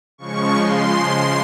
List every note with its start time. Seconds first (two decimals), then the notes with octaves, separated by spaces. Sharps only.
0.18 C#3 F3 G#3 C#6
0.56 C#3 F3 G#3 C6